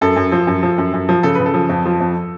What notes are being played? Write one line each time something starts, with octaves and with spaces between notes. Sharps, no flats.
F#2 A4
F#2
F3
F#2
F3
F#2
F#2
F3
C#3 A4
C#3 B4
A4
F3
F2
F3
F2